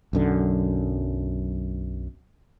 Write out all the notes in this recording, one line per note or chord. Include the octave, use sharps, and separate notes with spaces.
B1 F#2 D3